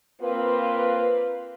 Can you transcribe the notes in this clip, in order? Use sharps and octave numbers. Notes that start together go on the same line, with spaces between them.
A#3 C4 F4 B4